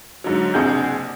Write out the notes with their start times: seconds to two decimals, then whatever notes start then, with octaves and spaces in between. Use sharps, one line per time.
0.24 G#2 D3 F#3
0.54 F#1 C3 D4 G#4 F#5 G6